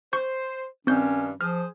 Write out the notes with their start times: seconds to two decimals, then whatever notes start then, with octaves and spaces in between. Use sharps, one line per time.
0.13 C5 C#6 G6
0.87 G2 D#3 C4 C#4 G6
1.41 F3 G#4 C5 F6